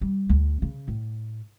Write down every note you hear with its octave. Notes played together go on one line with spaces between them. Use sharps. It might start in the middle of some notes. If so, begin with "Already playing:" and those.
G3
D2
C#3
A2